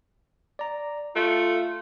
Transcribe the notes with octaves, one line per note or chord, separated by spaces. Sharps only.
D5 A#5
A3 F4 A4